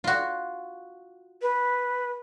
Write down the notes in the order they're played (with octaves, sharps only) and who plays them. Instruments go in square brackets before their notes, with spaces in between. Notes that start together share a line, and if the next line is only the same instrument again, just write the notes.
[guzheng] F4 F#4
[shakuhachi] B4